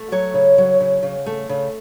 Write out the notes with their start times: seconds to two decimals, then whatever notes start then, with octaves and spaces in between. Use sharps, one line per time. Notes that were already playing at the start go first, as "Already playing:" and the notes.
Already playing: A3
0.12 F#3 C#5
0.34 C#3
0.58 F#3
0.80 C#3
1.03 C#3
1.26 A3
1.49 C#3